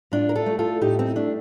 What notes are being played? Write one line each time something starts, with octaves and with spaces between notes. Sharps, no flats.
A2 D4 F4
A#4
F4 A4
A3
F4 A4
A2 D#4 G4
C4 D#4
A3 D4